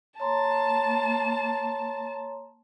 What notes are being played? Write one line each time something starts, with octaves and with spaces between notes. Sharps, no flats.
A#3 C#5 A5 A#5 C6